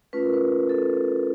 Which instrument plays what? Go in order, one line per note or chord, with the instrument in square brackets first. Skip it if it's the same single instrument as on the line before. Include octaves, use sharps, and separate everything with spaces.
[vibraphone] A3 C#4 F4 B4
A#4
B4
A4